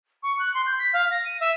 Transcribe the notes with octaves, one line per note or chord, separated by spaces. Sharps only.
C#6
F#6
C6
G6
B6
F5
A#6
D#7
E5